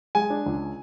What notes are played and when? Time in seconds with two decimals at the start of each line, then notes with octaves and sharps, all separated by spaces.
0.15 G#3 G#5
0.30 D4
0.46 C#2